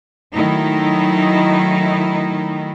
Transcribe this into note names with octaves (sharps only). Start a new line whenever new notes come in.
D#3 F#3 A3 D#4 E4